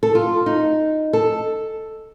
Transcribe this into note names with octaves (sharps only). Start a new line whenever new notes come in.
A4
F4
D#4
A4